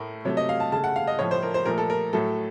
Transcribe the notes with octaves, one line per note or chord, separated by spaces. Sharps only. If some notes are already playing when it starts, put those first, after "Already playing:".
Already playing: A2 A3 A#4
C3 F#3 A3 C#5
D#5
F5
A5
C#3 A3 A5
F#5
F5
D#5
A2 F3 A3 C#5
C5
A#4
C5
A#2 F3 A3 A#4
A4
A#4
A2 F#3 A3 A4